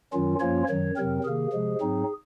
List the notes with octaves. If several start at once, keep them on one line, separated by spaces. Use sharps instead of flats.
F#2 D#3 F#3 C#4 F4
F#2 F3 A#3 C#4 F4 C#5
F#2 D#3 F#3 C#5
F2 C3 F#3 C4 A#4
C3 D#3 A#3 G#4
C3 F3 G#3
G#2 F#3 C4 D#4